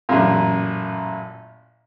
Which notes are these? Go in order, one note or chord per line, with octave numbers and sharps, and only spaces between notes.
A1 F#2 A#2